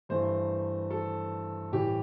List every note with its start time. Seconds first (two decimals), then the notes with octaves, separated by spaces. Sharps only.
0.09 G2 E3 A3 C5
0.90 A4
1.72 A2 E3 G3 G4